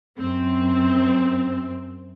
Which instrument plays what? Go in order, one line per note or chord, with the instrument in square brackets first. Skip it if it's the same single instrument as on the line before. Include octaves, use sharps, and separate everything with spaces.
[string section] F#2 C4